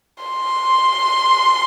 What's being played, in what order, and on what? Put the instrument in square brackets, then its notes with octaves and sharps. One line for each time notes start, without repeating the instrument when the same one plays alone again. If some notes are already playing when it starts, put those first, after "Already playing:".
[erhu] C6